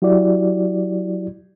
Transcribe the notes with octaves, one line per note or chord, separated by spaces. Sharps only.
F#3 E4 F#4 G4 D5